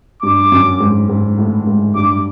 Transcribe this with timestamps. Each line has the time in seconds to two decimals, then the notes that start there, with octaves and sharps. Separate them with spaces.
0.23 G2 D6
0.52 F#2
0.80 G#2
1.09 G#2
1.38 A2
1.67 G#2
1.95 G2 D6